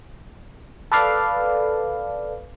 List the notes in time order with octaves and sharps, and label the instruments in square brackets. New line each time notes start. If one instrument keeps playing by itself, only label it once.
[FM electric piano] A4 B4 D5 F5